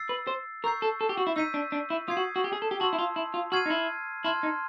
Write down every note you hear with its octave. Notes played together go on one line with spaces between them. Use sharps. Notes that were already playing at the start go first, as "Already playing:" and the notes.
Already playing: E6 A6 C7
B4
C5
A#4 C#6 E6 G6 C7
A4
A4
G4
F#4
E4
D#4 E6 G6 B6 D#7
D4
D4
E4
F4 D#6 G#6 C7
F#4
F#4
G4
G#4
A4
G4
F#4 A5 C6 E6
E4
F4
E4
F4
F#4 F6 G#6 C7 D#7
D#4
E4
E4 A5 C6 F6 G#6
D#4